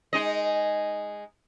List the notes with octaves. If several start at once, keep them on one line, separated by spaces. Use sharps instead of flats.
G#3 D#4 D#5